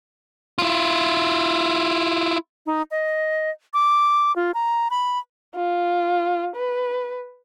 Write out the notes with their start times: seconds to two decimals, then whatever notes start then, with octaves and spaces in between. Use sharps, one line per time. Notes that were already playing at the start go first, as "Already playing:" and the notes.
0.58 E4 F4
2.66 D#4
2.91 D#5
3.74 D6
4.36 F4
4.54 A#5
4.90 B5
5.56 F4
6.56 B4